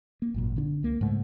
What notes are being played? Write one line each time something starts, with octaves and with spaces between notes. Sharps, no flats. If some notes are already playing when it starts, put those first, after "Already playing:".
A#3
G#1 F#2 A#2
D3 C#4 D4
C#2 A#3
G#2 C#3 G#3 A3